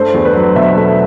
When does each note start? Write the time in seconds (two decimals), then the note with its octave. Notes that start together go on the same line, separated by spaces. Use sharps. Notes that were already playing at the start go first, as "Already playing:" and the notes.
Already playing: G2 A3 C5
0.14 E2
0.25 B4
0.35 F#3
0.55 B2 E5
0.77 A3